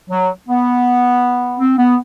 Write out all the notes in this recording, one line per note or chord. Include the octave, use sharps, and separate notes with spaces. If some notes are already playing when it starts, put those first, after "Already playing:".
F#3
B3
C4
B3